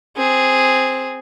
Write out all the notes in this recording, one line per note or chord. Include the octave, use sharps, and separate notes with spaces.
C4 G#4